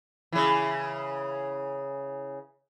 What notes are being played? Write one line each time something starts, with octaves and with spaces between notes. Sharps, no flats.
C#3 E3